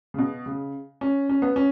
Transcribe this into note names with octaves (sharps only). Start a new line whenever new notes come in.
C#3
B2
C#3
C#4
C#4
B3
C#4